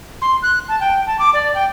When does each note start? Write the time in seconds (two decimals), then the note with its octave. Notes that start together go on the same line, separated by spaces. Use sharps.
0.22 C6
0.43 F#6
0.68 A5
0.80 G5
1.07 A5
1.19 D6
1.34 D5
1.55 G5